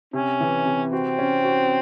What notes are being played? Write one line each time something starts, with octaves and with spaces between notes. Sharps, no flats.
C3 C#4
E3
C3
C4 F#4
C#4
F#4